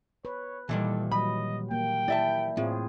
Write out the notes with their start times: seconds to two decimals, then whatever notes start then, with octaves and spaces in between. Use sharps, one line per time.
0.25 B4 C#5
0.69 A#2 D#3 E3 G3 A4
1.11 F#3 D#5 B5
1.71 A#3 G5
2.08 E4 D5 E5 A5
2.57 A2 C4 F4 G#4